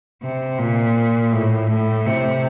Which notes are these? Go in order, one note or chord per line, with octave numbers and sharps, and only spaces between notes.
C3
A#2
A2
A2
C3